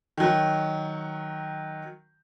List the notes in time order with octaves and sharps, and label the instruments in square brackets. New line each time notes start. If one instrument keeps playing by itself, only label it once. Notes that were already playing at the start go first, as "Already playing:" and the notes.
[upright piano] D#3 F#3